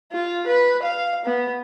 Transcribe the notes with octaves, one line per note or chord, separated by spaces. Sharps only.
F4
B4
F5
B3